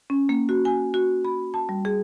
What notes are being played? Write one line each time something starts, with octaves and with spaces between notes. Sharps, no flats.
C#4
A#3
F#4
G#5
F#4
B5
A5
G3
G#4